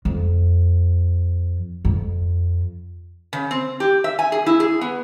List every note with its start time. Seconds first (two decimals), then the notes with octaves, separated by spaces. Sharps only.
0.05 F2
1.85 F2
3.33 C#3
3.51 C4
3.80 G4
4.04 E5
4.19 G#5
4.32 G#4
4.46 E4
4.60 G#4
4.81 B3